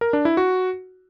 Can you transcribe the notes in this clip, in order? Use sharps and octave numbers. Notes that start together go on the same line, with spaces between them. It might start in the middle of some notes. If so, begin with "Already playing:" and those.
A#4
D4
E4
F#4